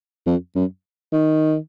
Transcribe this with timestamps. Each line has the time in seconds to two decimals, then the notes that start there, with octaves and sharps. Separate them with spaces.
0.27 F2
0.55 F#2
1.13 D#3